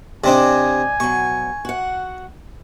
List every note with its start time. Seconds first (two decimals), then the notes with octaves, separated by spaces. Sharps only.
0.24 C3 C4 D4 D5 D#5 G#5
1.00 B2 F#3 C#6
1.65 F#4 F#5